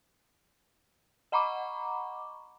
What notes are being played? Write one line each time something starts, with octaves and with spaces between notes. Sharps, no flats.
D#5 F#5 A#5 B5 C#6 D6